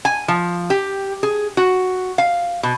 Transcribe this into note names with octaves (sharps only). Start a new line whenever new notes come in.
G#5
F3
G4
G#4
F#4
F5
B2